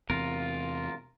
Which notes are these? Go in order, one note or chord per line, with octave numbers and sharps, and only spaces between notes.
E2 C3 F4 A#4